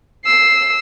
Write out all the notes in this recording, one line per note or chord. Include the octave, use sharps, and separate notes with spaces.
E6 C7